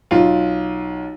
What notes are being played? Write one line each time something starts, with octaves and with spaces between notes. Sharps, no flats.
B1 F4